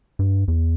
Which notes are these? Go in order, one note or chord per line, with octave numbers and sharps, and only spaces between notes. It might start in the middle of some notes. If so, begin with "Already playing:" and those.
G2
E2